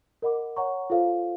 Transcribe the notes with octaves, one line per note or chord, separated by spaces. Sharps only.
A#4 D#5 F#5 B5 D6
C#5 F#5 A#5 C#6
F4 A4 C5 F5